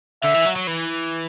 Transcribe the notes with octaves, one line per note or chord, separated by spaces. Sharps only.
D3 E5
E3
F#3
F#3
E3